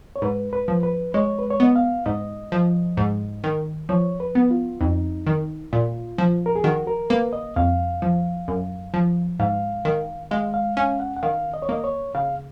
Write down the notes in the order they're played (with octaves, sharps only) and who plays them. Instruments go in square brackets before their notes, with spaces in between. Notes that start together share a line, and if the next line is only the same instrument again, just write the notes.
[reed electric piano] C#5
[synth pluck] G#2 [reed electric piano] B4
[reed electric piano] B4
[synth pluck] F3
[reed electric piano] B4
[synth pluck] G#3 [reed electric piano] C#5
[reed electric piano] B4
C#5
[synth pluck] B3 [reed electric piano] D#5
[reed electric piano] F5
[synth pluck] G#2 [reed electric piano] D#5
[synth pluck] F3
G#2
D#3
[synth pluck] F3 [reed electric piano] C#5
[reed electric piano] B4
[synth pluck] B3
[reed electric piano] F4
[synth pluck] F2 [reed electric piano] D#4
[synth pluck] D#3
[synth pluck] A#2 [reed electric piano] F4
[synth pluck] F3
[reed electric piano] A#4
G#4
[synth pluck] D#3 [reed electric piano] F#4
[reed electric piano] A#4
[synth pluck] A#3 [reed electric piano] B4
[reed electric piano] D#5
[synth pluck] F2 [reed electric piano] F5
[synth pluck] F3
F#2
F3
[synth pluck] G#2 [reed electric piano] F5
[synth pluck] D#3
[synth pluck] G#3 [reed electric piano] F5
[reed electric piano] F5
[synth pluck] C#4 [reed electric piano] F5
[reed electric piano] F#5
F#5
[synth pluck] D#3 [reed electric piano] F5
[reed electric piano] D#5
C#5
[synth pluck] A#3 [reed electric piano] D#5
[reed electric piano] C#5
[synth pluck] C#3 [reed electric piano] F5